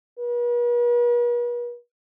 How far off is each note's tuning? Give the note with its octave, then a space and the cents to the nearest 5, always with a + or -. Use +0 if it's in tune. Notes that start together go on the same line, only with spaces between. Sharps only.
B4 -45